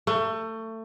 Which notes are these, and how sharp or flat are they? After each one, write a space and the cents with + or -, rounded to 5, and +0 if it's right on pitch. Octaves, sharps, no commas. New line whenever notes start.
A3 +25